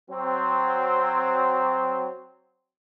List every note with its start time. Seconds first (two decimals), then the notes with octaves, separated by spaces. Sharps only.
0.11 F#3 C4